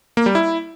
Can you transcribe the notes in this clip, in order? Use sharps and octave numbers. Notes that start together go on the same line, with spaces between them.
A#3
G3
E4